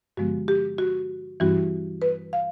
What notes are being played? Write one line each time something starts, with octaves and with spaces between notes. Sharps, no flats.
G2 D3 F3 G#3 B3 F#4
G4
F#4
G2 E3 G3 C4 E4 F#4
B4
F5